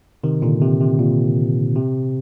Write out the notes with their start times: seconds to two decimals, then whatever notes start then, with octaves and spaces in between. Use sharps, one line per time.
0.24 C3 D#3
0.42 A#2 D3
0.62 C3
0.81 C3
0.99 A#2
1.75 C3